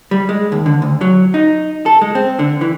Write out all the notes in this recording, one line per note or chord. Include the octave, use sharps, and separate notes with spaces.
G3
G#3
D#2
D3
D2
F#3
D#4
A4
G#3
C4
D3
E3